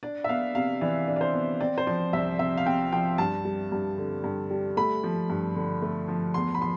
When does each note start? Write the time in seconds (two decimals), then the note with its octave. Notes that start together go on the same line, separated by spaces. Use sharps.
0.03 D4 D5
0.24 E5
0.29 B3 F5
0.55 C3 F5
0.81 E3 D5
1.08 D4
1.16 D5
1.21 C5
1.34 B3
1.61 C4 D5
1.78 C5
1.87 F3 D5
2.13 C2 E5
2.39 C3 E5
2.57 F5
2.66 C4 G5
2.92 F3 G5
3.18 G2 A5
3.45 G3
3.72 G2
3.98 D3
4.24 G2
4.50 G3
4.77 A3 B5
5.04 F3
5.30 G2
5.56 D3
5.82 A3
6.08 F3
6.34 E2 C6
6.55 B5
6.61 F3 C6